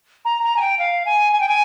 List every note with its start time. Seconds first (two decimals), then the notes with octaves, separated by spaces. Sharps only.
0.25 A#5
0.43 A#5
0.57 G#5
0.61 G5
0.79 F5
1.06 G#5
1.33 G#5
1.40 G5
1.48 G#5